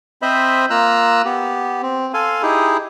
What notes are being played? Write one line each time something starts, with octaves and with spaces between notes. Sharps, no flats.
C4 C5 D#5 E5 B5
A#3 F4 A#5 E6 F#6
B3 G4
C4
A4 F5 G#5 C6
D#4 E4 G4 G#4